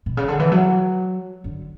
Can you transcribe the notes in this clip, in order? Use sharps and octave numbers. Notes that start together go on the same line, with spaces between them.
B2
C#3
D3
E3
F#3
D3